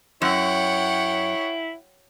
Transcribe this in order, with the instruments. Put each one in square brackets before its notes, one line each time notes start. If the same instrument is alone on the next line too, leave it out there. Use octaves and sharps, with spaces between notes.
[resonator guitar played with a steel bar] F#2 [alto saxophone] E4 [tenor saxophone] C#5 [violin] F#5 G5